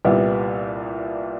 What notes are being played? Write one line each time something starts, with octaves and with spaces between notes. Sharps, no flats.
C2 A#2 G3 B3 E4